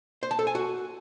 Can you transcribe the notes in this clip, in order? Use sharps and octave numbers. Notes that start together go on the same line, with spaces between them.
C5
A5
A4
G#5
F#4